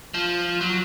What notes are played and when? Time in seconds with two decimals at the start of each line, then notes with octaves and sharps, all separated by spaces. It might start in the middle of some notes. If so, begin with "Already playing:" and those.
0.14 F3
0.61 F#3